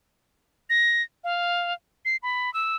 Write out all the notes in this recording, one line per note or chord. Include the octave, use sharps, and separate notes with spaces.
A#6
F5
C7
B5
E6